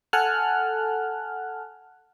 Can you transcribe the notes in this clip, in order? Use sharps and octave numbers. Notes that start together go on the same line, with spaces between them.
A4 F#5 G#5 A5 F6 F#6